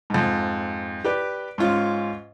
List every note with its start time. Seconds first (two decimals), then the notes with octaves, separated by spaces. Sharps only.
0.10 F2 G#2
1.05 G4 B4 D5
1.58 G#2 C#4 F4 F5